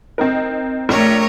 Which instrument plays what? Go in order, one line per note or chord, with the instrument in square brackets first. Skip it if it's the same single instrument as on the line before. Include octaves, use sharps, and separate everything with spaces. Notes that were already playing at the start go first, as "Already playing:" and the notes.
[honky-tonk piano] C4 D#4 A#4
[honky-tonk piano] A#1 [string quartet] A3 A#4 C#5